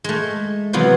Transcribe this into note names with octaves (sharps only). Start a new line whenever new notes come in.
G#3 A3
C3 E3 F#3 B3 F4 C5